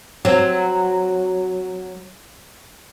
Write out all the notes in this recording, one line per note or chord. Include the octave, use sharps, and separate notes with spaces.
F#3 C4